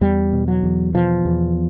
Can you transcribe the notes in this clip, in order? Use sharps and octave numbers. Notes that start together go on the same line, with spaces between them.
E2 G3
B2
F#3
E2
B2 F3
E2